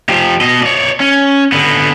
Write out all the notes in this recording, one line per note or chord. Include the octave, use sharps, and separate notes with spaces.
F3 G4
B2 D#5
C#5 D5
C#4
D3 B3